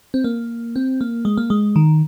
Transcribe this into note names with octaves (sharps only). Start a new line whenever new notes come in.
C4
A#3
C4
A#3
G#3
A#3
G#3
D#3